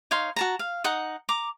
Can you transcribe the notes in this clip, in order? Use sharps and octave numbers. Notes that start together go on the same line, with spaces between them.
D#4 C#5 F5 C6
F#4 A5 A#5
F5
D#4 F#5 D#6
A#5 D6